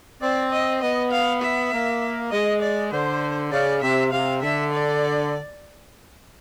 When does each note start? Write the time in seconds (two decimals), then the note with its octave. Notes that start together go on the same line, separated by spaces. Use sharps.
0.21 C4 D5
0.51 D#5
0.81 B3 D#5
1.11 F5
1.42 E5
1.72 A#3
2.31 G#3 D#5
2.62 D5
2.91 D3 C5
3.52 C#3 D5
3.82 C3 E5
4.12 C3 F5
4.42 D3 E5
4.72 D5